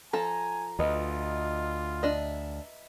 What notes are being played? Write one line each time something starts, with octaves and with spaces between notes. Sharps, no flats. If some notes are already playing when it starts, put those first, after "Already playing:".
F3 A4 G#5 A#5
D2 F4 B4 D#5
D4 D#5 E5